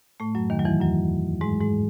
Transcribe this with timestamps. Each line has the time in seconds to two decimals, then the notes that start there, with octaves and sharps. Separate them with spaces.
0.20 A2 A3
0.35 F#2 F#3
0.50 D#2 D#3
0.59 F#3
0.65 E2 E3
0.80 F#2 F#3
1.41 G#2 G#3
1.60 G#2 G#3